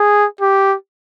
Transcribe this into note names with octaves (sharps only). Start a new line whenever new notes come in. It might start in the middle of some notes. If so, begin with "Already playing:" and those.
Already playing: G#4
G4